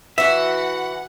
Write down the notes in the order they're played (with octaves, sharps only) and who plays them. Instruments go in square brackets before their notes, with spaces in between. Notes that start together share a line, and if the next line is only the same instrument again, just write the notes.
[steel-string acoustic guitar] E3 F#4 [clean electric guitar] E5 [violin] F#5